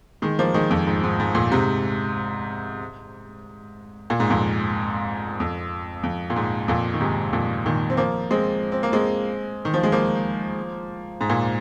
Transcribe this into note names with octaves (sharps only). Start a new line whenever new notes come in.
D#3 G#3
F3 A#3
D#3 G#3
F2
G#2
G#2
G#2
F2 A#2
G#2 C3
A#2
G#2
F2 A#2
F2
F2
A#2
G#2
F2 A#2
D#3
G#2 C3
F2 A#2
A#2 D#3
C4
F3 A#3
G#3 C4
C4
A#3
G#3 C4
D#3
F3
G#3
F3 A#3
G#2
A#2